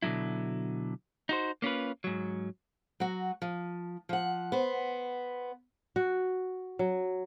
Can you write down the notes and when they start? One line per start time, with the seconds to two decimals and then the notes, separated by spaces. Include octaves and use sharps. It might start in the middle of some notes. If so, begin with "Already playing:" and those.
0.03 B2 D3 F3 F#3 E4
1.29 D#4 F#4 C5
1.62 A#3 C#4 F4 B4
2.04 G#2 F#3
3.00 F#3 F#4
3.42 F3
4.09 F3 F#5
4.52 B3 C5
5.96 F#4
6.79 F#3